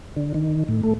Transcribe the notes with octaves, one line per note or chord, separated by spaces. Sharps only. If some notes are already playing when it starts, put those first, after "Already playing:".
D3
D#3
A2
A3